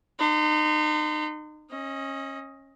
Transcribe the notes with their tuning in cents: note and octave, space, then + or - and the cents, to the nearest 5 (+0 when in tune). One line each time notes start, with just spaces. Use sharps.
D#4 -35 C6 -35
C#4 -25 D#5 +15